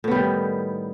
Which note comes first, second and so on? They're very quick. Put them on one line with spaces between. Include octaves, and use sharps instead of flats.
A2 B3 G3 D#3